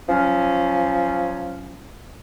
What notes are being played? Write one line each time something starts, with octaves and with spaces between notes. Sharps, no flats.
F3 F#3 C#4